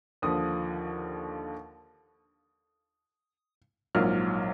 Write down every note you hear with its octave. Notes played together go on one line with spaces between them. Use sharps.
D#2 D3 F3 D#6
A#1 G#2 F#3 A#3 F6